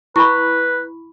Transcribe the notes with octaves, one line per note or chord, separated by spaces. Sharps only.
E4 B4 B5 C#6